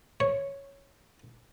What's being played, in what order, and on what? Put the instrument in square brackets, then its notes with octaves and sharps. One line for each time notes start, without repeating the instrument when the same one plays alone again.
[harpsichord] C#5